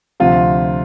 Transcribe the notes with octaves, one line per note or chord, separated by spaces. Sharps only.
D2 C3 F3 F4